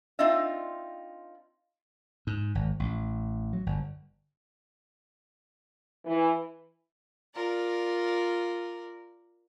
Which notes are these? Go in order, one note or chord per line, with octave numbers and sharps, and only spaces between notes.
C4 D4 D#4 F4 D#5 E5
G#2
G#1
A1
F#3
G1
E3
F4 A#4 D5